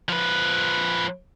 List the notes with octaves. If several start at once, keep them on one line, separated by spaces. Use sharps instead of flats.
F3 B4